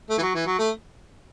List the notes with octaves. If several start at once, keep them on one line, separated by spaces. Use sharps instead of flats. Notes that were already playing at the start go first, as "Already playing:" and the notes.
A3
E3
F#3
E3
F#3
A3